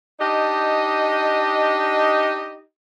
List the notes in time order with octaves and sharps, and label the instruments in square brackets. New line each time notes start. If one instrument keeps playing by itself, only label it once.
[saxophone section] D4 D#4 G4 D#5